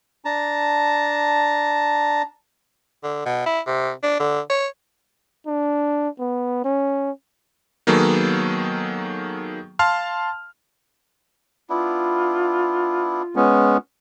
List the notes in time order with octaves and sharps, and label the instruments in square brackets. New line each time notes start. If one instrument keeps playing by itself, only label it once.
[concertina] D4 A5 A#5
[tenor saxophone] D3
B2
E4
C3
D4
D3
C#5
[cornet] D4
B3
C#4
[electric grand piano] D#3 F#3 A#3 B3 G#4 A4
F5 A5 C6 F6
[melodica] B3 D4 E4 [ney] F4
[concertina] G#3 B3 C#4